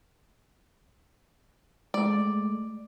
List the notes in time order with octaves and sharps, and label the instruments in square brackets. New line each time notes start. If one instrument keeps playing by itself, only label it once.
[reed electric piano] G#3 A3 [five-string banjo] D5